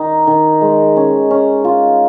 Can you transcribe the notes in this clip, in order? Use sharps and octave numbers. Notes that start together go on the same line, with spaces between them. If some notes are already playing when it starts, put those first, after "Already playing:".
Already playing: D#3 D#4
D#3
G#3
C#4
C#4
F4